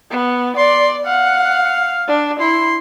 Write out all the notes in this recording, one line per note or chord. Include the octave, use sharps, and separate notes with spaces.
B3
D5 C6
F5 F#5
D4
E4 C6